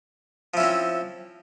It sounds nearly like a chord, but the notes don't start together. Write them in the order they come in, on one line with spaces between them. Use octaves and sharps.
F3 E4 C#4 C4